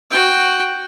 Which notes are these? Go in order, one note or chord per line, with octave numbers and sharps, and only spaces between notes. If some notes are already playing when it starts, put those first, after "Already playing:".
F#4 G5